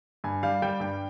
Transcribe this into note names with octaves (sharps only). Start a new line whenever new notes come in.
G2 G#5
G3 F5
G3 G5
G2 G5